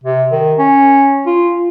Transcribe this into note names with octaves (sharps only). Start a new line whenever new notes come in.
C3
D#3
C#4
F4